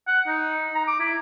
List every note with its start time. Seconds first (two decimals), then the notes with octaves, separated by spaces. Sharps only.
0.07 F#5
0.27 D#4
0.75 A#5
0.87 D6
0.99 E4